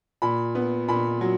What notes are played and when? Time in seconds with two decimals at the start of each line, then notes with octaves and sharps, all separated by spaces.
0.22 A#2 B5
0.55 B3
0.88 A#2 B5
1.21 F#3